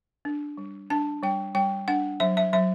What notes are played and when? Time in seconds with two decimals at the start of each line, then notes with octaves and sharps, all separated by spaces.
0.25 D4
0.57 G3
0.90 D4 A5
1.23 G3 G5
1.55 G3 G5
1.88 D4 F#5
2.20 F#3 E5
2.37 E5
2.53 F#3 E5